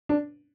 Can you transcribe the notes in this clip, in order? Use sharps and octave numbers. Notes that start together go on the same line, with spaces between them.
D4